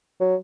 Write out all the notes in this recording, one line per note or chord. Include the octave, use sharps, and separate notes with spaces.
F#3